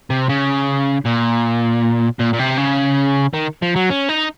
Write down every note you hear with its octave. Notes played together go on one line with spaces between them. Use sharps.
C3
C#3
A#2
A#2
A#2
C3
C#3
D#3
F3
F#3
C#4
D#4